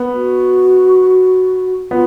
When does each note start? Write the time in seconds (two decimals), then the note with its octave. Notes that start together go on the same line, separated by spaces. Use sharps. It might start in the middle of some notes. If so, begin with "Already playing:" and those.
Already playing: B3
0.13 F#4
1.91 B3 F4